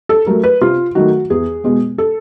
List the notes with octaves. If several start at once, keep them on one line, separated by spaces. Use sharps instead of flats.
A4
F#3 A3 A#4
B4
C3 F4
D#3 F#3 A3 F#4
E2 G#4
B2 G#3 B3
A4